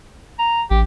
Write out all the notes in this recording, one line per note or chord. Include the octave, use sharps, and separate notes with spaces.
A#5
A1 G4